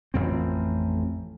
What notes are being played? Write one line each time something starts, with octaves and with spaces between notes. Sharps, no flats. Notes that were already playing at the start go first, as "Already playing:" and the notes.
A1 F2 C4